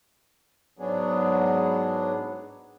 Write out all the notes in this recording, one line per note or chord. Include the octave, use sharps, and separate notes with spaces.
G#2 F#3 B3 D4 G#4